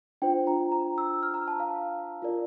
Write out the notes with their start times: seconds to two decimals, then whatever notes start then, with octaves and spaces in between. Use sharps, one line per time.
0.22 D4 F4 C5 G5
0.47 A#5
0.72 A#5
0.98 E6
1.23 F6
1.34 A#5
1.48 A5
1.60 F5
2.22 F4 A#4 D5